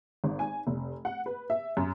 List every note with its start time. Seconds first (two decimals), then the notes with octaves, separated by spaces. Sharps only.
0.24 G#1
0.39 G#5
0.67 F1
1.05 F#5
1.26 B4
1.50 E5
1.77 F#2